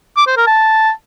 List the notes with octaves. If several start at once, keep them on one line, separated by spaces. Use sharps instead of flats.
D6
C5
A#4
A5